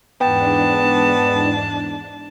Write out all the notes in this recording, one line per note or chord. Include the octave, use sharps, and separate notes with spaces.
E2 G#2 B3 D4 G5 A5